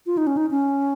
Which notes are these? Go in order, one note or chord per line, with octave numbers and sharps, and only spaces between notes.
F4
D#4
C#4
D#4
C#4